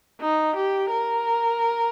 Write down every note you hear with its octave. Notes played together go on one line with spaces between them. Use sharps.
D#4
G4
A#4